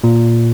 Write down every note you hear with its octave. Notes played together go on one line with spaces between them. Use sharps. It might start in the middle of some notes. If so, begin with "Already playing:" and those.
A#2